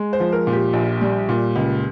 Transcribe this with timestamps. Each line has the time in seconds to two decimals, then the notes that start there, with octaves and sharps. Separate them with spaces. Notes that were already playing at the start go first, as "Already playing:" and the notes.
Already playing: G#3
0.13 C5
0.20 F3
0.32 A#4
0.47 A#2
0.53 G4
0.73 A#1
1.01 G3
1.29 A#2
1.56 C#2